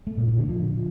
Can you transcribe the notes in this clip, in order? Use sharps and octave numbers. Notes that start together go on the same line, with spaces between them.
A3
A#2
A#2
D3
F3